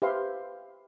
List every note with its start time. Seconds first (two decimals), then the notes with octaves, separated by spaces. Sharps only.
0.02 G4 B4 C5 E5 F5 C6